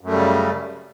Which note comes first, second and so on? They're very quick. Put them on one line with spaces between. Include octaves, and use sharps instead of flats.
F#2 A3 G3 C#3